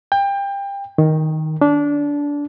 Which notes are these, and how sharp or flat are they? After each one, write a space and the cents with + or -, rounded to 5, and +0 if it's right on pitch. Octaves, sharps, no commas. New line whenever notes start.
G5 +25
D#3 +5
D4 -20